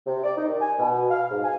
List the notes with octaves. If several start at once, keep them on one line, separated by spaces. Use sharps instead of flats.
C3
D5
D#4
D#3
G#5
B2
F5
G#2
G#5